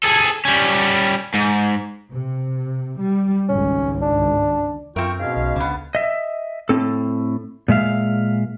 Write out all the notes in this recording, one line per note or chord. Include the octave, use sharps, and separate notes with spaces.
G#4 A4
G3 C#4
G#2
C3
G3
G#1 C#2 G#2 C#4
D4
F#2 C4 F4 A#4 E5 G5 C#6
G#2 B2 C#4 F5
B1
C#2 D3 B3
D#5 E5
A2 C4 A4
A#2 G#3 E5 F5